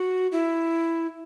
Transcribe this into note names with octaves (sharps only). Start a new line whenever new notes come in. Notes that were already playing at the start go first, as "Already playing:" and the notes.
Already playing: F#4
E4